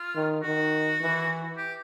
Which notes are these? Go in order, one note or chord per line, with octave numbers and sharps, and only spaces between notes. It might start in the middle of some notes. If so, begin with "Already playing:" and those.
Already playing: F4
D#3
D#3 F#4
E3
G4